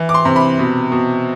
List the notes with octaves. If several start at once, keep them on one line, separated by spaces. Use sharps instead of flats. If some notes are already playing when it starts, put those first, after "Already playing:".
Already playing: E3
D6
C6
C3
B5
B2
B2